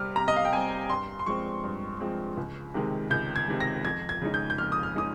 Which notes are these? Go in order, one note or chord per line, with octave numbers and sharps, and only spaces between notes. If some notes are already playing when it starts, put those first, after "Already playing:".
Already playing: C3 G3 C4 F6
C3 A#5
D#5
F5
G5
G3 C4 G#5
G2 C6
C6
F3 G#3 C4 C#6
G2
F3 G#3 C4
C#2
C3 D#3 G#3
C#2 G6
G#6
C3 D#3 G#3
A#6
F2 G#6
G#6
C#3 G#3 D#4
G6
G6
F2 F6
D#6
F6
C#3 G#3 D#4 D#6